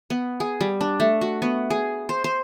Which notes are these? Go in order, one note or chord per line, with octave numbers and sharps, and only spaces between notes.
B3
G#4
G3
D4
A3
F#4
B3
G#4
C5
C5